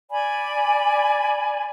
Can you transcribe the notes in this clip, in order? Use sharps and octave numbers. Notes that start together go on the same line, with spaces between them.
D5 G#5 B5